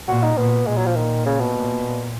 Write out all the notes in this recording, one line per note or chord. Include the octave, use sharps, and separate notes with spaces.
A#2 F#4
D#4
A#2 B3
A#2 G#3
F#3
F3
D#3
C#3
B2
A#2